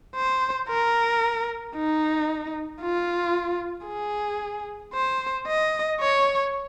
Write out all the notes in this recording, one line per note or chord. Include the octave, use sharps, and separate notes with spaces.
C5
A#4
D#4
F4
G#4
C5
D#5
C#5